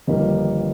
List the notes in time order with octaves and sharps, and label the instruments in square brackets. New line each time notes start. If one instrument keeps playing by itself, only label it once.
[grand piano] G1 F2 D#3 G3 A#3 D#5